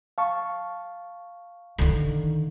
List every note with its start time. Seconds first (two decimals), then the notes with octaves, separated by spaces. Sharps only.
0.18 F5 A5 C#6
1.79 D3 D#3